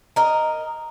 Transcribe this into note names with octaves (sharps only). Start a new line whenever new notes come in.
A#4 D#5